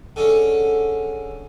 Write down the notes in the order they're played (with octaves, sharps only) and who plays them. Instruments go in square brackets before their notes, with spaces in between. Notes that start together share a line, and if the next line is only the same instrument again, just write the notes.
[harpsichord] D3 G#3 C#4